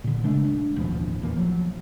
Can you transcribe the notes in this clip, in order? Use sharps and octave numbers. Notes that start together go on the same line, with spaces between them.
A#2 D3
C#3 G#3 A3 D4
D4
A1 D#2 B2 F3
A#1 E2 E3 A#3
F3 F#3